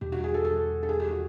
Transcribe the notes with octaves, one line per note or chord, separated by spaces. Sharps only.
E2 B2 G3 G4
F#4
G#4
A4
A4
A4
G#4
G4
F#4